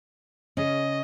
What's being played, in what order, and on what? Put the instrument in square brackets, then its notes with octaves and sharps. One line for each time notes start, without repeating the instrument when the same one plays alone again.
[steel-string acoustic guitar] C#3 C#4 [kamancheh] D#5